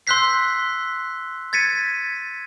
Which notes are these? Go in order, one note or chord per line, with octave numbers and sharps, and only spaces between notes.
C6 E6 F#6 G6 B6 C7
G#6 A6 B6 C#7 D#7